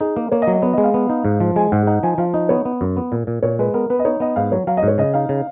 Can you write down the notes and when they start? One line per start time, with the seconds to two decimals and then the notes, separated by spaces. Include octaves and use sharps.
0.01 D#4 G#4
0.16 A#3 A#4
0.31 A#3 C#5
0.42 D#5
0.47 F#3
0.53 D#5
0.62 B3 C#5
0.73 D#5
0.78 G#3
0.84 F5
0.94 B3
1.10 D#4
1.25 G#2
1.40 F3
1.56 G#3 G#5
1.72 G#2 F#5
1.87 D#4 F#5
2.03 F3 G#5
2.18 F3 F5
2.33 D#4 D#5
2.49 B3 C#5
2.65 B3
2.81 F#2
2.97 B3
3.12 A#2
3.27 A#2
3.42 A#2 C#5
3.59 G#3 B4
3.74 B3 A#4
3.90 B3 B4
3.99 D#5
4.05 D#4 C#5
4.20 B3 D#5
4.36 G#2 F5
4.52 F#3 C#5
4.67 F#3 F5
4.77 D#5
4.83 G#2 C#5
4.98 C#3 D#5
5.14 D#4 F5
5.29 C#3